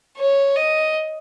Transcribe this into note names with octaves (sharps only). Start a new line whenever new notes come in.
C#5
D#5